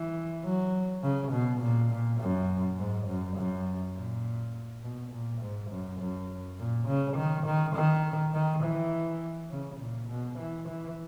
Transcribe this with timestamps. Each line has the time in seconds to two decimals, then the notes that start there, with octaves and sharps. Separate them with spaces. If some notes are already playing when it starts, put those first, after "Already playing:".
Already playing: E3
0.45 F#3
1.03 C#3
1.33 B2
1.61 A#2
1.91 A#2
2.20 F#2
2.79 G#2
3.08 F#2
3.37 F#2
3.96 A#2
4.83 B2
5.12 A#2
5.42 G#2
5.71 F#2
6.00 F#2
6.59 A#2
6.87 C#3
7.17 D#3
7.46 D#3
7.76 D#3
8.34 D#3
8.63 E3
9.51 C#3
9.80 A#2
10.09 B2
10.39 E3
10.68 E3